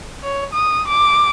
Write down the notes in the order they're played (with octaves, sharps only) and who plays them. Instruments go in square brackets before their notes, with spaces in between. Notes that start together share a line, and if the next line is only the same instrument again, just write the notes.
[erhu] C#5
D#6
D6